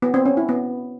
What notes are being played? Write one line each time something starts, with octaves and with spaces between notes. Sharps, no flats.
B3
C4
C#4
E4
B3